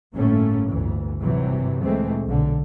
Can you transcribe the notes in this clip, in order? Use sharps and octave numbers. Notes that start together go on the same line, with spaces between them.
G1 A2 A3 A#3 C#4
G1 D2 E3
G#1 G2 C3 E3 F#3
D2 A#2 E3 G#3 A3 C4
B1 D3